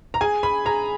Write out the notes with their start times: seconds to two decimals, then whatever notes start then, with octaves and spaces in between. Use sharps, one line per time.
0.14 A#5
0.21 G#4 G#5
0.43 B5
0.65 G#4 A#5